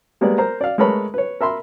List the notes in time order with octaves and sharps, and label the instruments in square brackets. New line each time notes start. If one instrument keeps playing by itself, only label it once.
[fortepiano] G3 G#3 A#3 B3 D5
A#4 C5 A#5
D5 F5
G#3 A3 A#4 B4 C#5 B5
B4 C#5
A#4 E5 B5 C6